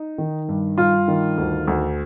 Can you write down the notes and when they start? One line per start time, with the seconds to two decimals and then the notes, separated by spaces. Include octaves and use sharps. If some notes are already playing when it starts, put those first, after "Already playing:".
Already playing: D#4
0.18 D#3
0.49 G2
0.78 G2 F4
1.08 D#3
1.38 D2
1.68 D2